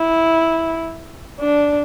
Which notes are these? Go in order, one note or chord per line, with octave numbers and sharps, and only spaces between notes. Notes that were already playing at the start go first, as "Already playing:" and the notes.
Already playing: E4
D4